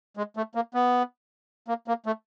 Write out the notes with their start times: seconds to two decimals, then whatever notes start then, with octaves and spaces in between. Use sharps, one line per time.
0.17 G#3
0.37 A3
0.55 A#3
0.74 B3
1.68 A#3
1.88 A#3
2.06 A3